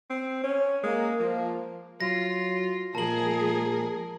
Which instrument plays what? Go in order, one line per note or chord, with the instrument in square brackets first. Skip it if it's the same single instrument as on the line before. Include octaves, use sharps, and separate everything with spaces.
[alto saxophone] C4
C#4
[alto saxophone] G#3 [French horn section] A#3
[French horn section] F3 [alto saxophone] A#3
[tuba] F#3 [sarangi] F4 [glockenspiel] A#6
[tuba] A#2 [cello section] F3 G#3 G#4 [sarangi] A#4 [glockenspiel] A5 F#7